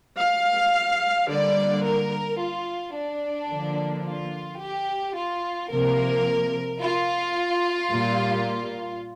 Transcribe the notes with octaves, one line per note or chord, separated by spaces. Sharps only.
F5
D3 G3 A#3 D5
A#4
F4
D4
D3 F3 A#3
F4
G4
F4
C3 F3 A#3 A#4
F4
A#2 G3 A#3